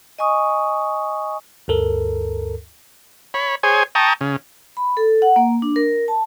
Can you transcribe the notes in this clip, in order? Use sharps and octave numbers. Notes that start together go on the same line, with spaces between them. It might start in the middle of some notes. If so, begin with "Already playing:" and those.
D#5 G#5 C#6 D#6
D2 G2 A4 A#4
C#5 B5
G#4 C5 C#5 G#5
G5 A5 A#5 C#6 D#6
C#3
B5
A4
F#5
A#3
D4
A#4
A5